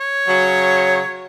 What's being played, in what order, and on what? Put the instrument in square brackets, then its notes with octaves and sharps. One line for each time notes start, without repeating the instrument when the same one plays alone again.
[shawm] C#5
[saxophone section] C#3 F#3